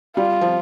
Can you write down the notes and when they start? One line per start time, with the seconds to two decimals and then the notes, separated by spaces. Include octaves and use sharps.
0.17 G3 F4
0.41 F3